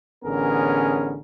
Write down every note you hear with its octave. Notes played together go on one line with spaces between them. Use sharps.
A1 D3 B3 C#4 G#4 A#4